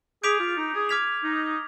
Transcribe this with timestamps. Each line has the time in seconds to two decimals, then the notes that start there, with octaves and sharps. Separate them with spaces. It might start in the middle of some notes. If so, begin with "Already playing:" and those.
0.23 G#4 D6 G6 B6 D7 F7
0.40 F4
0.56 D#4
0.74 G#4
0.89 D6 F6 G#6 B6 F7
1.23 D#4